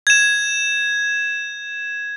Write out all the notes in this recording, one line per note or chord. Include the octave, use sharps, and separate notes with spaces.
G#6 E7